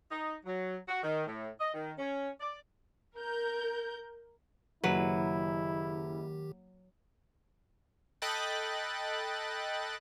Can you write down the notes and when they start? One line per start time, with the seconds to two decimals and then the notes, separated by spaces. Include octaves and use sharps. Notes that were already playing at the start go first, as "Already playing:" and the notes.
0.11 D#4
0.46 F#3
0.88 F#4
1.03 D#3
1.27 A2
1.60 D#5
1.74 D#3
1.99 C#4
2.41 D5
3.15 A#4 G6
4.84 F#1 D#3 F#3 E4 G4 B4
8.22 A4 D#5 G5 B5 F#6 A6